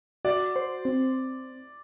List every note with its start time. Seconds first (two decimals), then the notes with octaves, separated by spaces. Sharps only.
0.25 F#4 D5
0.56 C5
0.85 C4